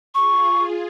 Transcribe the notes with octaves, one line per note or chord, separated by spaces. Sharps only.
F4 G#4 C#6